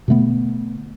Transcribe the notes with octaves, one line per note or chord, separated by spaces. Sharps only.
B2 D3 A3 B3